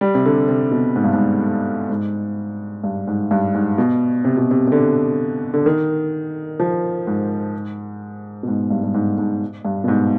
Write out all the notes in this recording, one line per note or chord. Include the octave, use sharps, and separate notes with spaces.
G3
C3
D3
C3
B2
G#2
G2
G#2
G#2
G2
G#2
G2
G#2
B2
C3
B2
C3
C3
D3
D3
D#3
F3
G#2
B2
G#2
G2
G2
G#2
G#2
G2
B2
G#2